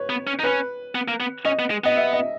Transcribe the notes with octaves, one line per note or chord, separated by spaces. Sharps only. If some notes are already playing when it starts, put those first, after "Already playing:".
Already playing: B4 C#5
B3
C#4
D#4
C#4 B4
B3
A#3
B3
C#4 D#5
B3
G#3
B3 D#5
E5
D#5